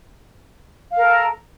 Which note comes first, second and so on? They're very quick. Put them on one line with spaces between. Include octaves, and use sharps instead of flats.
F5 A#4 A4